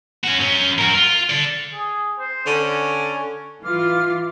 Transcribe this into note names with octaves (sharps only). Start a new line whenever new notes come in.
C#4 F#4
F#3 C#4
F#4 A#4
F4
A4 D5
G#4
C5
D3 C#4
E3 F4 F5 D6 F6